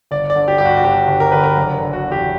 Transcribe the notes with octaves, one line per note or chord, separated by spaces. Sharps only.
G1 D5
D5
D3
G4
G2 G4
F#4
F#4
G1 G4
G1
A#4
D3 B4
A#4
F#1
D3
F#4
E2
G4